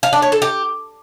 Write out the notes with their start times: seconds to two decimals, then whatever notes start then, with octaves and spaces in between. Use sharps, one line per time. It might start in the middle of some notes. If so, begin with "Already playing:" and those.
0.03 F5
0.13 D4
0.22 C#5
0.32 A4
0.42 G4